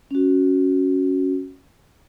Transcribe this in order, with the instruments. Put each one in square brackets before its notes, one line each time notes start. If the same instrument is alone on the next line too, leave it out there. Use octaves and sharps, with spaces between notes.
[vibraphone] C#4 F#4